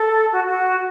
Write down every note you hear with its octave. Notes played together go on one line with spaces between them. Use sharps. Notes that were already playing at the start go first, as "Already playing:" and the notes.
Already playing: A4
F#4
F#4